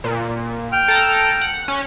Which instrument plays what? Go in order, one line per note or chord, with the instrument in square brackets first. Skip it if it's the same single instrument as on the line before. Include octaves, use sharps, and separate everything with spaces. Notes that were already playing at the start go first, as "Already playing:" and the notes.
[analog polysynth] A#2
[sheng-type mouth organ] G5 F6
[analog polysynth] A4 A#5
F#5
C#4